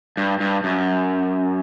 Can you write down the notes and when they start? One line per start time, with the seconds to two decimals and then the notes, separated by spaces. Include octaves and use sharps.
0.17 G2
0.40 G2
0.64 F#2